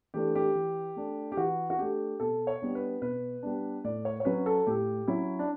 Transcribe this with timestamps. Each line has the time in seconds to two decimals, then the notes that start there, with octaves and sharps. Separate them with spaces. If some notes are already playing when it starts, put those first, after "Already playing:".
0.14 E3 A3 D4 G4
0.35 G4
0.55 E3
0.96 A3 D4
1.32 G4
1.37 E3 F#4
1.70 F#4
1.78 A3 D4 G4
2.20 B2 A4
2.47 C#5
2.62 G3 B3 D4
2.75 B4
3.02 B2 B4
3.43 G3 B3 D4
3.84 A2 D5
4.05 C#5
4.20 C#5
4.25 F#3 C#4 B4
4.46 A4
4.67 A2 G4
5.08 F#3 C#4 E4
5.39 D4